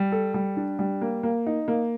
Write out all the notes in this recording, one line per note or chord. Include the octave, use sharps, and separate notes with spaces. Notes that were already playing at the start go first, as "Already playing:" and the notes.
Already playing: G3
A4
G3
D4
G3
A#3
A#3
D#4
A#3